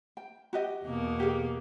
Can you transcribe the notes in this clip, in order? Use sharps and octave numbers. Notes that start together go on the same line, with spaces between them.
G5
F#4 G4 D#5
E2 B2 A#3
G4 G#4